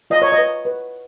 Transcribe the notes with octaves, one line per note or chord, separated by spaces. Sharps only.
F4 D#5
C#5
D#5
B4
B4